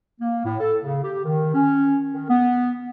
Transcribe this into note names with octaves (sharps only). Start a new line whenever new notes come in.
A#3
A2
A4
C#3
G4
D#3
C#4
D#3
B3